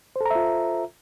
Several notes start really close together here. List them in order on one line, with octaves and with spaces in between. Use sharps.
C5 A4 A#5 E5 F4